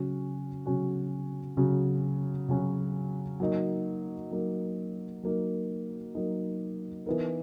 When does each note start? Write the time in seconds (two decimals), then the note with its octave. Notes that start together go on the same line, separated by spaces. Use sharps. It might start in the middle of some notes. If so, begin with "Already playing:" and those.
Already playing: C#3 F#3 C#4 F#4
0.66 C#3 F#3 C#4 F#4
1.57 C#3 F#3 C#4 F#4
2.49 C#3 F#3 C#4 F#4
3.40 F#3 A#3 D#4
4.31 F#3 A#3 D#4
5.23 F#3 A#3 D#4
6.15 F#3 A#3 D#4
7.06 E3 B3 D#4 A#4